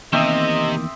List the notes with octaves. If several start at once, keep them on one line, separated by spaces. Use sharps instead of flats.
E2 C3 D#3 A#3 C4 D#5 E5 D#6